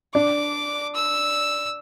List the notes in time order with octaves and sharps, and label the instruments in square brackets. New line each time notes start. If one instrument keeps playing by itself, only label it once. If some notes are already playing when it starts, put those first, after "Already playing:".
[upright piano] D4 [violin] D6
[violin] E6